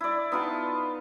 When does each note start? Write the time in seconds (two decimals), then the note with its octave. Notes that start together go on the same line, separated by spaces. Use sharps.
0.01 E4 D5
0.32 B3 D#4 F4 A5